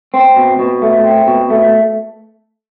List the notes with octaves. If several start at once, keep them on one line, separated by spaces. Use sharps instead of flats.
C4
B2
B2
A3
C4
B2
A3